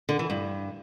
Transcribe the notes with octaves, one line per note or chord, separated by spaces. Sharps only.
D3
E3
G2